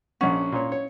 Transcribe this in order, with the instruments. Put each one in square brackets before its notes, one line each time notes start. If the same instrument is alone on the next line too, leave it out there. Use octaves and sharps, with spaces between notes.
[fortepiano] A#1 F#5 [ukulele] C#4
[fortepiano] A#2 C#5
C#5